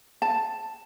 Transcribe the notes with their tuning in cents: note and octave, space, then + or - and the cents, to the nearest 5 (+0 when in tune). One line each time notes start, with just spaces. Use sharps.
A5 +5